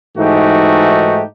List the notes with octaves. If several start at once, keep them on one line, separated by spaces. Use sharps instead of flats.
G#2 E3 A3 D#4 F#4 G4